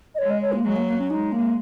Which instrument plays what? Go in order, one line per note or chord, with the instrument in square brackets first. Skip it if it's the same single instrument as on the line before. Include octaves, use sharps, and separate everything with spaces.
[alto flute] D#5
[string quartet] G#3 [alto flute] C#5
[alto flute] D#5
C#5
A#3
[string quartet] F#3 [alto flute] G#3
[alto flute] A#3
A#3
C#4
[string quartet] G#3 [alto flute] D#4
[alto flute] A#3